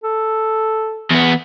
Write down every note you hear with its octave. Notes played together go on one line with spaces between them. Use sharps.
A4
E2 B3